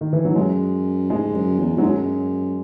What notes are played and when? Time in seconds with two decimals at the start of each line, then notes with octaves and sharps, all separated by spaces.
0.01 D#3
0.13 E3
0.25 F#3
0.36 F#2 G#3
1.10 G#2 G#3
1.34 F#2
1.59 E2
1.77 G#2 F#3
1.83 F#2 G#3